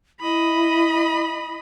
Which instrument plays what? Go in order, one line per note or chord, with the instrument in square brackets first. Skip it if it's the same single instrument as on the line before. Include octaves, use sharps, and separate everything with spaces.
[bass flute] E4 [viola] D#5 B5